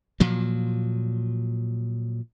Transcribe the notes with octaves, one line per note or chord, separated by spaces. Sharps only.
A#2 F3 F#3